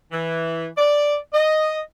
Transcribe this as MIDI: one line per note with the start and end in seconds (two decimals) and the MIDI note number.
0.11 0.65 52
0.78 1.15 74
1.33 1.78 75